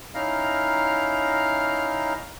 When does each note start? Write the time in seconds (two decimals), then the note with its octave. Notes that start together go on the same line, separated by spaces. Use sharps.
0.15 C#4 D#4 E4 F5 A#5 F6